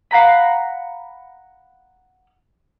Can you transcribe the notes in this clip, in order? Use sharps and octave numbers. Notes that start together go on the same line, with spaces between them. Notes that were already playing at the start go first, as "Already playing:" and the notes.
F5 F#5 A#5 B5